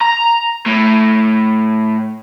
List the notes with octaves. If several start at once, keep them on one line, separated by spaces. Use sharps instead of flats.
A#5
A2